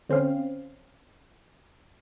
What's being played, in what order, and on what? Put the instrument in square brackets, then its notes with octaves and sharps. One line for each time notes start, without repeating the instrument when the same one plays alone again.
[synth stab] D3 C4 C#4 F5